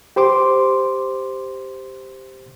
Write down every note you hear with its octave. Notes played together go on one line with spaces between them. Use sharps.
G4 C5 C6 D6